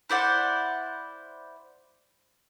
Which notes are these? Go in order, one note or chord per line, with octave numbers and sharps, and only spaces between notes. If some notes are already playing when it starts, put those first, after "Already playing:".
E4 C5 D5 F#5